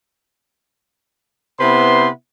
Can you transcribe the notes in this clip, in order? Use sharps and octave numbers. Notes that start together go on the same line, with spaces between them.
C3 B3 E4 B4 C5 C6